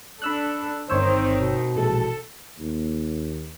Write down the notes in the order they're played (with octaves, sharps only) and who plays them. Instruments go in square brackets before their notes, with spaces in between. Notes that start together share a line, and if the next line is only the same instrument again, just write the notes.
[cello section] D4 A4 [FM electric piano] B5 E6 F#6
[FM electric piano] G1 C#5 E6 [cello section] D#3 C4 D#4 [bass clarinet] C5
[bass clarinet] B2
[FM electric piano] A#1 E3 G#3 [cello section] A4
[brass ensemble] D#2